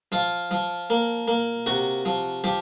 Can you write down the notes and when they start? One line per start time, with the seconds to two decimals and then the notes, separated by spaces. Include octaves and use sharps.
0.12 F3 F4
0.51 F3
0.90 A#3
1.28 A#3
1.66 C3 F#4
2.05 F3
2.44 F3 G4